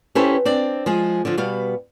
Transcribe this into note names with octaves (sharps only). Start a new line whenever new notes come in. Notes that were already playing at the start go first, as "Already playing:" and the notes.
C#4 E4 G4 A4 B4 C5
C4 D4 D5
F3 G#3 G#4
D3 F3
B2 G3 B3 F5